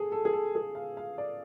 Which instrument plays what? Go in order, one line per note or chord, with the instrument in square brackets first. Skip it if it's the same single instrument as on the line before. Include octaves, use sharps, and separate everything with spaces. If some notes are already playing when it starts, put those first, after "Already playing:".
Already playing: [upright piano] G#4 A4
A4
G#4
A4
G#4
F5
F5
D5